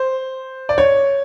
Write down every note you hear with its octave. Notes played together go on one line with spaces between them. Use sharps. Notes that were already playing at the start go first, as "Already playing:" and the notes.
Already playing: C5
D5
C#5